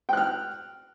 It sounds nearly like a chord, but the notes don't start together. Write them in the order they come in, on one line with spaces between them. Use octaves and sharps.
G5 F#6 F6